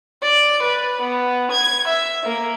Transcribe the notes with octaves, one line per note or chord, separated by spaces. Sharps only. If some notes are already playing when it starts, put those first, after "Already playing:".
D5
B4
B3
G#6
E5
A#3